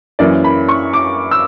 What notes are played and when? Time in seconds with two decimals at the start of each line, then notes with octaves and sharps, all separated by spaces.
0.19 F#2 E3 A#3 C#4 E4 D5
0.44 B5
0.69 C#6
0.93 D6
1.31 E6